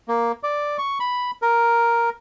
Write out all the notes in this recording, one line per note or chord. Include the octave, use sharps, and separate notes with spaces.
A#3
D5
C#6
B5
A#4